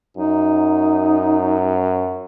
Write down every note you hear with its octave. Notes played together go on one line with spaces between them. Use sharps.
F#2 D#4